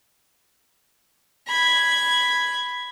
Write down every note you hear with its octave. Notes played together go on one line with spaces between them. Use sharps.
B5 G#6